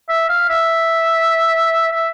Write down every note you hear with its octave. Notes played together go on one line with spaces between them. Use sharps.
E5
F5
E5
E5